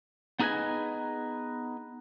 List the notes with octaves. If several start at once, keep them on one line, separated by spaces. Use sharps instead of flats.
B3 D#4 G#4 B4 D#5 G#5